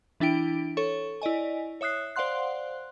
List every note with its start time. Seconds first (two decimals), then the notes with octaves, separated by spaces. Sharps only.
0.20 E3 D4 E4 G5 D7
0.77 A4 C#5 C#6
1.22 E4 D5 D#5 G#5
1.81 C#5 E5 D#6 F#6 C7
2.16 C5 D5 F5 F#5 C6 F#6